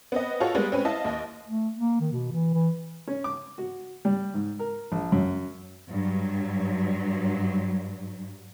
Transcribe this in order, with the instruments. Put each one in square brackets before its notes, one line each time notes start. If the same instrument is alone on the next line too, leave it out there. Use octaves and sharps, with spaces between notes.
[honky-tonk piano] B3 C4 D#5
F4 F#4 A4 C#5
G3 G#3 A#3 B3
C4 C#4 B4
E4 D#5 F5 A5
D#2 D#5
[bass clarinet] A3
A#3
D#3
B2
E3
E3
[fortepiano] C#4
D6
F#4
G3
G#2
A#4
A#1
F#2
[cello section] G2 F#3